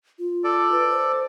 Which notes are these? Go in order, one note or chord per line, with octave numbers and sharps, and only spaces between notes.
F4
A4 D5
B4
C5